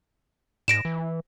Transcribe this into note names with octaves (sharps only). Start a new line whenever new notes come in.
G#2 A#6 D7 E7
E3